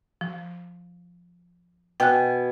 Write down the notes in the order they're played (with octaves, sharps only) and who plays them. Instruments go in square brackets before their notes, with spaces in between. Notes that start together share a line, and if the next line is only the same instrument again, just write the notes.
[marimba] F3
[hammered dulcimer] B2 G#5 [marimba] G5 F#6